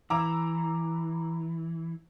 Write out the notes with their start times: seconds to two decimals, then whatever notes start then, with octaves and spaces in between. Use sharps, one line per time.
0.10 E3 A#5 D6 E6